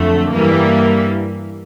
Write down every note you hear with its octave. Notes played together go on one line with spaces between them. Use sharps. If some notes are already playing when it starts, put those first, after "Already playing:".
Already playing: F2 D3 F#3 A3
G2 E3 G3 A#3